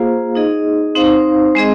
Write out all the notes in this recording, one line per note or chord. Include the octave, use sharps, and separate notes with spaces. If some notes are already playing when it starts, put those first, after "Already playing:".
Already playing: A#3 F4 G#4 C5 F5
D#4 G#4 D#5
C4 D#4 C5 F5
G#3 C4 G#4 D#5